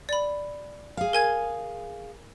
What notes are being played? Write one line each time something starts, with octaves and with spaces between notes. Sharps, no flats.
D5 B5
G#4 F5
A#4 G#5 G#6